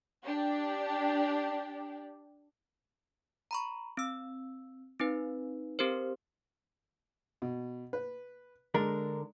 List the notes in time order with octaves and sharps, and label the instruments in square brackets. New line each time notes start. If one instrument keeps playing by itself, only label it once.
[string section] D4 G4
[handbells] A#5 B5 C#6
C4 E6
C4 D#4 B4
C4 G4 A#4 C5
[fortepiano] B2
B4
[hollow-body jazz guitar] D3 D4 A#4 [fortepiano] G#3